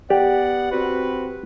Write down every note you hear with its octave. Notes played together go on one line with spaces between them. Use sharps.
B3 G4 D5 F#5
C4 F#4 B4